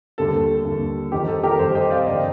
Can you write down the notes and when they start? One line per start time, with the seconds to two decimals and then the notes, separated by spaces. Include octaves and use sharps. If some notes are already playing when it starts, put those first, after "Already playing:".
0.18 D#2 D3 G3 A4
0.65 D#2 D3 G3
1.12 F2 D#3 G3 G4
1.28 A4
1.43 G4 A#4
1.59 F2 D#3 G3 A4 C5
1.75 D#5 G5
1.91 D5 F5
2.07 F1 F2 D3 C5 D#5